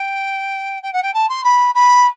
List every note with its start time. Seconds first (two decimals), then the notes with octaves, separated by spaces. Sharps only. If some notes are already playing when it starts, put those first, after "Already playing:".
Already playing: G5
0.82 G5
0.93 F#5
1.03 G5
1.13 A5
1.29 C6
1.44 B5
1.74 B5